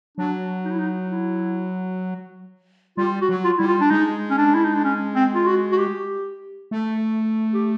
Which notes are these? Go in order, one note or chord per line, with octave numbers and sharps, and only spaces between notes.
F#3 D4
D#4
E4
D#4
E4
G3 F4
F#4
F#3
F4
G3 E4
F4
D4
G#3 D#4
C#4
D4
E4
D#4
D4
C#4
C4
F4
F#4
F#4
G4
A3
G4